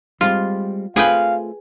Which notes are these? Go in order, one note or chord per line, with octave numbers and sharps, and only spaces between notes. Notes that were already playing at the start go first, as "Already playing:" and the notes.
G3 G#3 C4 F4
A3 C4 F4 G#4 B4 F5 G5